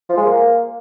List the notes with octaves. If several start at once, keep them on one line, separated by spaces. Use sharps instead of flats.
F3
G#3
A#3